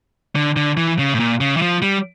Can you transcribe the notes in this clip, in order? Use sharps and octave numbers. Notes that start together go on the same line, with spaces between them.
D3
D3
E3
C#3
A2
A#2
C#3
E3
F3
G3